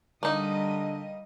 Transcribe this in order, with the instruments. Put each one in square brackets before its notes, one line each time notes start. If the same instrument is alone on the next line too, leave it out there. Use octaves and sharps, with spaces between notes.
[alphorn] D3 [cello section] G3 D#5 [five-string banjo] A#3 D#4